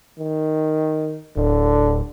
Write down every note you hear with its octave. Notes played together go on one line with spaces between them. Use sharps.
D#3
D1 D3